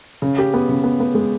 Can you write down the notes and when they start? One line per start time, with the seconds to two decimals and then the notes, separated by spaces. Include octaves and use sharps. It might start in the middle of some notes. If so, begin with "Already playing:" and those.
0.22 C#3
0.38 G4
0.54 B3
0.69 C#3
0.84 B3
1.00 B3
1.15 G#3